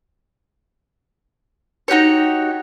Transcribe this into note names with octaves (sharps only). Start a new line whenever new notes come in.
D#4 F#4 G4 C#5